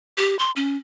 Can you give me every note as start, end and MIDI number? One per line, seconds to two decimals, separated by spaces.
0.18 0.38 67
0.39 0.51 84
0.56 0.77 61